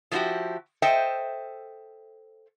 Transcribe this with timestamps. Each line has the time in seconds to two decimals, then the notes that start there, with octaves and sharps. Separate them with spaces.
0.11 F3 G#3 C4 E4 F#4 G4
0.82 A4 C5 D#5 E5 G5